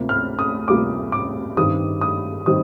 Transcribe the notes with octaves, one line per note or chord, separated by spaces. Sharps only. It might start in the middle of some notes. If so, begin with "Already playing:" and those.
Already playing: D2 C3 A#3 F4
F6
D#6
D2 C3 G3 A#3 F4 D6
D6
G2 D#3 G3 C4 D#4 D#6
D#6
D#3 G3 C4 D#4 D#6